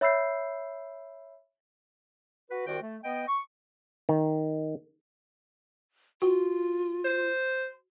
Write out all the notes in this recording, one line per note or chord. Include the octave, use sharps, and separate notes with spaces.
C#5 E5 B5 E6 G6 C7
F#4 B4
C2 D#3 F#4 C5 D5 G5
A3
B3 D#5 G5
C#6
D#3
F4 F#4
C5